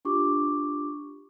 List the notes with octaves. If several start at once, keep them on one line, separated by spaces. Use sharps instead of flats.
D4 F4 G4 C#6 D6